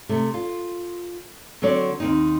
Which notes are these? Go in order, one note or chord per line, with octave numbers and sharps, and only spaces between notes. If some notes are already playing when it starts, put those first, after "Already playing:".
C3 A3
F4
D3 F#3 C4 F#4 C#5 D5
D#2 C4 D#4